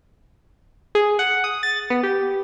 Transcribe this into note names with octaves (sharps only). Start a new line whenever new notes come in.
G#4
F#5
D#6
A6
B3
G4